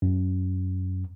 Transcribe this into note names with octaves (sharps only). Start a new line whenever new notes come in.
F#2